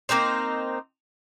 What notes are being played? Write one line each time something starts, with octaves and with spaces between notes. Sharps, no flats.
A#3 C4 D#4 C5